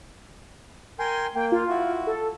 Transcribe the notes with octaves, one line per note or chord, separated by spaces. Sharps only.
A#4 G5 G#5 C6
A#3 G5
F4
E4 F#4
A4